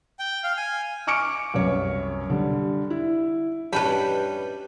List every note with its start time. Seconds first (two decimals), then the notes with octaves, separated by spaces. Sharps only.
0.19 G5
0.44 F5
0.57 G#5
1.07 G#5 C#6 D6 F6 C#7 D7
1.54 C2 F#2 C#5
2.30 D3 G3
2.90 E4
3.73 G2 G3 C#4 G4 B4 G5 A5 B5